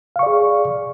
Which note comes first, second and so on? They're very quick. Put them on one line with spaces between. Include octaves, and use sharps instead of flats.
F5 C#6 D5 G#4